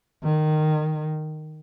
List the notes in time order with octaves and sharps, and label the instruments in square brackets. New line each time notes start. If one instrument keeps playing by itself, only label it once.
[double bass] D#3